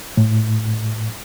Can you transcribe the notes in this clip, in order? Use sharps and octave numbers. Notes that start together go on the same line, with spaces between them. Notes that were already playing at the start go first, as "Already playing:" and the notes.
A2